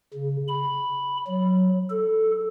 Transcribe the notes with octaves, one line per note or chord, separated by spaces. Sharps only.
C#3
B5
F#3
A4